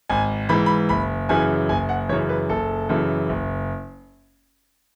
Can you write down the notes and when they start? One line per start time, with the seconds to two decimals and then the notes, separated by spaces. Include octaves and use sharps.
0.10 G#1 G#5
0.49 G#2 E3 B5
0.66 B5
0.89 F#1 B5
1.29 F#2 C#3 E3 G#5
1.69 F#1 G#5
1.89 F#5
2.09 F#2 C#3 E3 C#5
2.29 B4
2.49 F#1 A4
2.89 F#2 C#3 E3
3.29 F#1